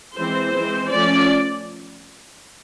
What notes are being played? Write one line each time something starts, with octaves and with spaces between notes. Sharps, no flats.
E3 G#3 C4 C5
E3 G#3 C4
F3 A3 C#4 D5